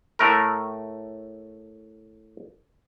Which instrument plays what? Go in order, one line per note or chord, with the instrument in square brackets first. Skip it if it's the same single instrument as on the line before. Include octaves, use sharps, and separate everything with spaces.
[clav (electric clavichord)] A2 A3 A#4